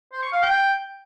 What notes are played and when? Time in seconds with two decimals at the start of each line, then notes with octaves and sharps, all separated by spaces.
0.13 C5
0.23 C#6
0.33 F5
0.43 G5